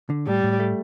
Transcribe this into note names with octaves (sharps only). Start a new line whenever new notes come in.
D3
A2 G3
A2
A3